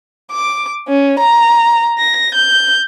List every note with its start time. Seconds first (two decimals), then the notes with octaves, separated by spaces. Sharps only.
0.31 D6
0.88 C#4
1.19 A#5
1.98 A#6
2.34 G6